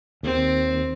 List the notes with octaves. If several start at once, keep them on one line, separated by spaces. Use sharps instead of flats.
D#2 C4